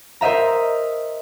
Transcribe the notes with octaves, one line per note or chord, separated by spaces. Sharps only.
A#4 C5 D#5 E5 A#5